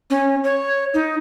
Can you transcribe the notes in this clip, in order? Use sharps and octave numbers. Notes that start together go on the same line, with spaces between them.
C#4
C#5
D#4